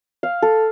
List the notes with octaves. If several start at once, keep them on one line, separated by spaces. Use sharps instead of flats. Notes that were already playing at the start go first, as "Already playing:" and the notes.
F5
A4